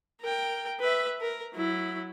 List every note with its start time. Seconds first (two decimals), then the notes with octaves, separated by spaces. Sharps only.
0.22 A#4 G5
0.80 B4 E5
1.21 A#4
1.55 F#3 E4